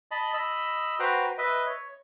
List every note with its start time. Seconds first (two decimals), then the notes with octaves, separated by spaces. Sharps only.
0.11 D#5 A5 B5
0.34 D#5 B5 E6
1.00 F#4 B4 C5 G5 A#5
1.38 B4 D#5 E5
1.66 C#5